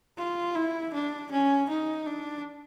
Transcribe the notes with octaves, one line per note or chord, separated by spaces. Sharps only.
F4
E4
D4
C#4
D#4
D4